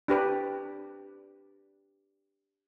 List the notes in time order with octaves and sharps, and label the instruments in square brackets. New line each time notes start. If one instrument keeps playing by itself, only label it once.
[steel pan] D4 G4 B4